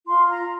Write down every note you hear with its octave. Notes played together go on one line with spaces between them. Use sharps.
F4 C6
A#5